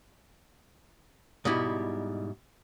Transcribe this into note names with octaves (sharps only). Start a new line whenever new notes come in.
G#2 B2 G3 E4